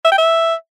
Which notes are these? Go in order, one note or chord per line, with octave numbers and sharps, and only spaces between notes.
E5
G5
E5